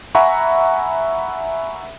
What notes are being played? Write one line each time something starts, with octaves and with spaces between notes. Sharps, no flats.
E5 F#5 G#5 A#5 B5 C#6